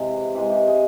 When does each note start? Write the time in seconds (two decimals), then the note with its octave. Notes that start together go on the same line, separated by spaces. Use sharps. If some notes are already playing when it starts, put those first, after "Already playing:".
Already playing: C3 E3 G#3 G#4
0.35 E3 G#3 G#4
0.50 G4
0.67 G#4